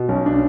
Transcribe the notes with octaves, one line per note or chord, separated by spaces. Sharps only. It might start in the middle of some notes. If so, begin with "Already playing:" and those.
Already playing: B2
B1 C#4
D4